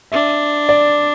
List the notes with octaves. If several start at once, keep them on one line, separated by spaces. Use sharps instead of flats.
D4 E5
D5